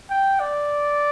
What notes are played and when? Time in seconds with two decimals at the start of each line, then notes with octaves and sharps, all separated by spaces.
0.10 G5
0.40 D5